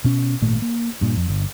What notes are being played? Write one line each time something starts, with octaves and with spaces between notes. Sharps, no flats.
B2 C#4
G#1 A#2 A3
A#3
G2 A#2
F2
G1